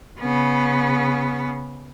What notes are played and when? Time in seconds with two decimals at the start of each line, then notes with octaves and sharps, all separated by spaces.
0.20 C#3 B3